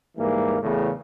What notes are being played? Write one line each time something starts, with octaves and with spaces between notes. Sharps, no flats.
G#2 E3 G3 A#3
E2 A2 C#3